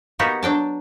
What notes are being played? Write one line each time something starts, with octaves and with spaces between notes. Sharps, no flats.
A#3 B3 D#4 F#4 G4
F#3 D4 G5 A5